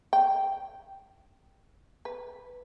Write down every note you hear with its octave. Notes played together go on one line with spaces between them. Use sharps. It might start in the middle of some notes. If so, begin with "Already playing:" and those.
G5
B4